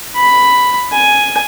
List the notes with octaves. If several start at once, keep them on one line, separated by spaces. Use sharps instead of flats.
B5
G#5